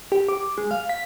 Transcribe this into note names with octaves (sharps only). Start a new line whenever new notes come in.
G4
D6
G#3
F5
B6